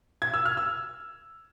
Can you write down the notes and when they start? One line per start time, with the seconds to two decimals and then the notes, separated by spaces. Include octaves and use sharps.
0.22 G#6
0.34 E6
0.45 F6
0.57 E6